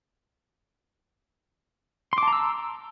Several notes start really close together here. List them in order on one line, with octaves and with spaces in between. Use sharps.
C6 D6 A5 A#5 E6